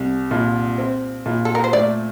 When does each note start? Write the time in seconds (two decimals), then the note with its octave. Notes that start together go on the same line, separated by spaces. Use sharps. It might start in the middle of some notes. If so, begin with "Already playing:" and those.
Already playing: C2
0.31 A#2
0.78 C4
1.26 A#2
1.45 A4
1.55 A#4
1.64 C5
1.73 A3 D5